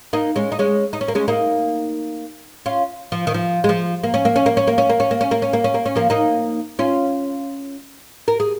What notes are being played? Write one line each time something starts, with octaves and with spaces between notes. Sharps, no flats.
A#3 D#4
G#3 C#4
D#4
G#3 C#4
D#4
C#4
A#3
G#3 C#4
A#3 D#4
C#4 F4
F3
D#3
F3
G#3
F3
A#3
C#4
A#3
C#4
A#3
C#4
A#3
C#4
A#3
C#4
A#3
C#4
A#3
C#4
A#3
C#4
A#3
C#4
F3 A#3
A#3 D#4
C#4 F4
A#4
G#4